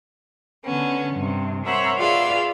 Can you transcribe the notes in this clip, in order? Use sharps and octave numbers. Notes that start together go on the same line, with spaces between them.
D3 B3 C#4
G2 C3
A#4 C5 C#5 E5 F#5 B5
F4 G#4 B4 D5 F5 E6